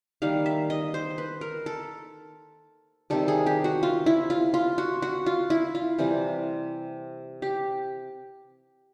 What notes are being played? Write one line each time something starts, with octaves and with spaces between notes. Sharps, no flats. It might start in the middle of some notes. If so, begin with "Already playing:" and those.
D#3 G3 A#3 F5
E5
D#5
C5
B4
A#4
A4
C3 D#3 G3 A4
G#4
G4
F#4
F4
E4
F4
F4
F#4
F#4
F4
E4
F4
C3 E3 G3
G4